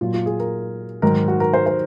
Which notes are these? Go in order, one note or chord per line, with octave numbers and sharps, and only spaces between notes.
A#2 F#3 F4
F4
G#4
A#4
G#2 D#3 F#3 A#4
F#4
A#4
C5
C5